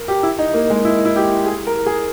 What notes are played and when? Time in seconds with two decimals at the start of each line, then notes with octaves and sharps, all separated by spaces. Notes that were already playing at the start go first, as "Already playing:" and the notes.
Already playing: A#4
0.08 G4
0.23 E4
0.39 D#4
0.54 A#3
0.70 G#3
0.85 E4
1.05 E4
1.16 G4
1.46 G#4
1.67 A#4
1.86 G#4